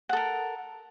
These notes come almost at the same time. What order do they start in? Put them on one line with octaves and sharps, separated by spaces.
F#5 A4 A#4